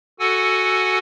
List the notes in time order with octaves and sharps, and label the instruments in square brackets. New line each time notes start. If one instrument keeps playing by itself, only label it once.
[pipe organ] F#4 A4 F#5 G#5 E6